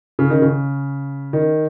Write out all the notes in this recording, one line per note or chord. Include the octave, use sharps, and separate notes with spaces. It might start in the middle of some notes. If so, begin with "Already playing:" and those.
C#3
D#3
C#3
D#3